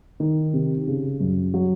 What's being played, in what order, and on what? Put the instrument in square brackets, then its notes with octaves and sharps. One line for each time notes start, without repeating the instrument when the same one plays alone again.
[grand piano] D#3
C3
C#3
F#2
F#3